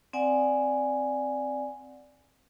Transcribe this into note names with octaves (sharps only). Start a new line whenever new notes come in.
C4 D5 F#5 G#5